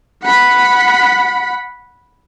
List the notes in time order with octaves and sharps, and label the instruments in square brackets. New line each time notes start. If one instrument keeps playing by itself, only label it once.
[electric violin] F#5 B5